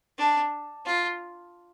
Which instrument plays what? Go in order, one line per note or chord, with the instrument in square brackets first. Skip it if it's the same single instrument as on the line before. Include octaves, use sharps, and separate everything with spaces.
[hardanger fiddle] D4
F4